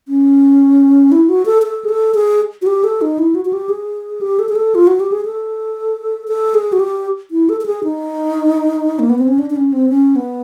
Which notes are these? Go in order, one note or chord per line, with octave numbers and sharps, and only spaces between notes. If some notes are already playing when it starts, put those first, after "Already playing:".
C#4
E4
F#4
A4
A4
G#4
A4
G#4
F#4
G4
A4
D#4
E4
F#4
F#4
G4
G#4
G4
A4
G#4
A4
F4
F#4
G4
G#4
A4
A4
G#4
F#4
G4
E4
A4
A4
G#4
D#4
A#3
B3
C4
C#4
D4
D4
C#4
C4
C#4
B3